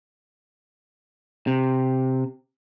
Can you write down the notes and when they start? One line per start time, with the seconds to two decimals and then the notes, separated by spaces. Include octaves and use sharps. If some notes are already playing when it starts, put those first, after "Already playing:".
1.47 C3